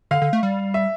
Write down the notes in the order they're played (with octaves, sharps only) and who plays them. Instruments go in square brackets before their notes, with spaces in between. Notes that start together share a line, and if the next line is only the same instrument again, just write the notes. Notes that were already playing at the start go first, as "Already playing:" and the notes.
[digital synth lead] D3 [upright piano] F5
[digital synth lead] D3
A3
G3
[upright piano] E5